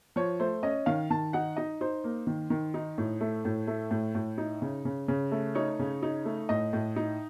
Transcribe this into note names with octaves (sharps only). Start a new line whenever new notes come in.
F3 C#5
A3 C5
C#4 D#5
D#3 F5
D#3 A5
D#4 F#5
D#4 D#5
D#4 C5
A#3
D#3
D#3
D#4
A2
A3
A2
A3
A2
A2
D#4
C#3
C#3
C#3
A3
D#4 C#5
C#3
D#4
A3
A2 D#5
A2
D#4